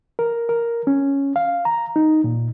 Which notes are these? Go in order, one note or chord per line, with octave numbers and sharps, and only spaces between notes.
A#4
A#4
C#4
F5
A#5
D#4
A#2